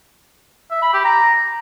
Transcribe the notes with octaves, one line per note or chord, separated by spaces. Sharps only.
E5
B5
G4
A#5